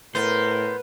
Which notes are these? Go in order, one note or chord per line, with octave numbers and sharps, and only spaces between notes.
A2 B3 A#4 C5